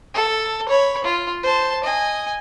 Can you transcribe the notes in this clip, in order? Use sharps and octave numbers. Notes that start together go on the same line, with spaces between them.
A4
C#5 B5
F4
C5 A5
D#5 G#5